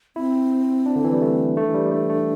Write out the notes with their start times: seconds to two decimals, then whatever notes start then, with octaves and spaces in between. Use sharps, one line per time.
0.16 C4 E4
0.86 D4
0.96 D3
1.04 E3
1.13 G3
1.22 A3
1.57 A3 D4
1.68 E3
1.74 G3
1.85 G3
1.92 A3
2.10 A3